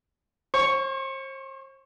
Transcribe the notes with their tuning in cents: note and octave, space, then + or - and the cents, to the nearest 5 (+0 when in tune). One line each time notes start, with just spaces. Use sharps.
C5 +40 C#6 +0